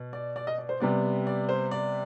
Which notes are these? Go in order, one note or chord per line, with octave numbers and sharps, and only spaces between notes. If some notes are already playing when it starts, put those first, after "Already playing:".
Already playing: B2
D5
D5
D#5
D5
C5
C3 G3 B3 D5
D5
C5
D5